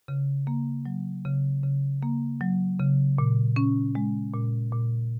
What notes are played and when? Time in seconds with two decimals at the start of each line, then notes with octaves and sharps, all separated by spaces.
0.08 C#3
0.47 A#3
0.86 F#3
1.25 C#3
1.64 C#3
2.03 A#3
2.41 F#3
2.79 C#3
3.18 A#2
3.56 C#4
3.95 G#3
4.33 A#2
4.72 A#2